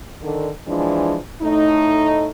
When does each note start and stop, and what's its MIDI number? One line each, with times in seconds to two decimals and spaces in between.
0.23 0.49 50
0.23 0.49 51
0.67 1.17 52
0.67 1.17 53
0.67 1.17 56
0.67 1.17 62
1.41 2.29 45
1.41 2.29 57
1.41 2.29 63